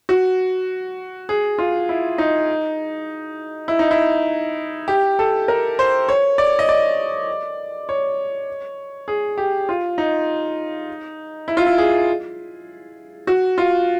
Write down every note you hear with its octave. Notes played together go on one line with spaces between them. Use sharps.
F#4
G#4
F4
E4
D#4
E4
D#4
E4
G4
A4
A#4
C5
C#5
D5
D#5
D5
C#5
G#4
G4
F4
D#4
E4
F4
E4
G#4
F#4
F4